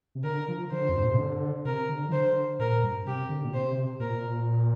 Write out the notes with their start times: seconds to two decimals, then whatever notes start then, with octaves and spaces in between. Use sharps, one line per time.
0.15 C3
0.24 D3 A#4
0.48 F3
0.71 D3 C5
0.89 F2
0.95 G2
1.03 A#2
1.11 C3
1.18 D3
1.65 C3 A#4
1.89 D3
2.09 F3
2.12 D3 C5
2.59 A#2 A#4
2.83 G2
3.06 C3 G4
3.29 D3
3.45 A#2
3.53 C3 C5
4.00 A#2 A#4